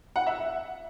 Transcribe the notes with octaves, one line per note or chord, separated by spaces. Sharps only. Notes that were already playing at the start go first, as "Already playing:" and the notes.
F#5
E5